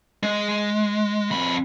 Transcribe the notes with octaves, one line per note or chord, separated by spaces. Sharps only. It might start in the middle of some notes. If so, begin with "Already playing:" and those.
G#3
F2 B5